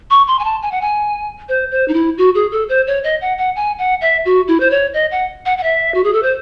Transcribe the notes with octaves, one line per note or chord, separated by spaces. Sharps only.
C#6
C6
G#5
A5
G#5
F#5
G#5
C5
C5
D#4
E4
F#4
G#4
A4
C5
C#5
D#5
F#5
F#5
G#5
F#5
E5
F#4
E4
C5
C#5
D#5
F#5
F#5
F#5
E5
F#4
G#4
A4
C5